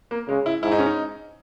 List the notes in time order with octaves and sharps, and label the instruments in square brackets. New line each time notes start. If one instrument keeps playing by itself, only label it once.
[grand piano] A#3
[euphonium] C#3 [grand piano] G#3
[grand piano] E4
[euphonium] G#2 [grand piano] E4
[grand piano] D#4
C#4
D#4